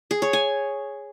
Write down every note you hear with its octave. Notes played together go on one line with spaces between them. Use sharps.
G#4
C#5
G#5